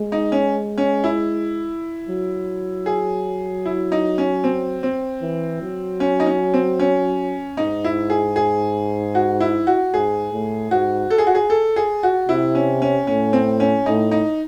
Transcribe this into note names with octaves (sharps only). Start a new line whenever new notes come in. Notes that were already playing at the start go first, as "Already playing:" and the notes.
Already playing: G#3
D#4
C#4
C#4
E4
F#3
G#4
E4
D#4
C#4
C4
C4
E3
F#3
C#4
D#4
C#4
C4
C#4
G#2 D#4
E4
G#4
G#4
F#4
E4
F#4
G#2 G#4
A2
G#2 F#4
A4
G#4
F#4
G#4
A4
G#4
F#4
C3 E4
C#4
C#4
A2 C#4
C4
C#4
A2 D#4
D#4